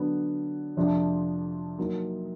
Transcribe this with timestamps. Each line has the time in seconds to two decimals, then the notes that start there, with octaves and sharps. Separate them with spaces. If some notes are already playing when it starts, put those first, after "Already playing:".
Already playing: D3 F#3 B3
0.77 F2 C3 F3 A3 D4
1.78 F#3 A#3 D#4